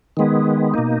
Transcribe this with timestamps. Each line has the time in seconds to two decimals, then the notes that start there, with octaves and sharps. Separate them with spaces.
0.17 D#3 G#3 B3
0.74 B2 A#3 D#4